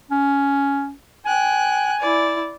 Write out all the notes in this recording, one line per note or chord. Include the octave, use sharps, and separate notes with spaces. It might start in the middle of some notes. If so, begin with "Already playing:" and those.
C#4
G5 G#5 F#6
E4 D5